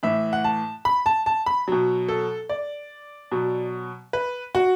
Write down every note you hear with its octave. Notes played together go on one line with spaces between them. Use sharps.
A2 E3 E5
F#5
A5
B5
A5
A5
B5
B2 F#3
A4
D5
B2 F#3
B4
F#4